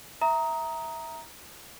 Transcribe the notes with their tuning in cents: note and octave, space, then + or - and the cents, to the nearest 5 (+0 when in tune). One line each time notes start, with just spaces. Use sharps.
E5 +0 A#5 +0 D#6 +20